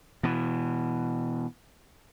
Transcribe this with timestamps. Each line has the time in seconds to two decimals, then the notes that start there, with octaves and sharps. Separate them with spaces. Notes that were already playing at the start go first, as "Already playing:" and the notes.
0.23 B2 E3